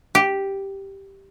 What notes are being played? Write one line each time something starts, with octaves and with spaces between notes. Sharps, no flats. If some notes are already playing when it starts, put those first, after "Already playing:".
G4